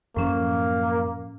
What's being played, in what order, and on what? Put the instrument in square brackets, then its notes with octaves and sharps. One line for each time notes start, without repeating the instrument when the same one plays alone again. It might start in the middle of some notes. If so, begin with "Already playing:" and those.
[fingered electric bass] F#2 F3 [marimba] A2 C#4 [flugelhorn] A#3